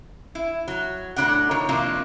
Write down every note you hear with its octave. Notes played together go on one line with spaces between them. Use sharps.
E4
F#3
A2 F#3 B3 D4 D5 F#5
A#2 D#3 C#5
F2 C3 A#3 D4 E4 F4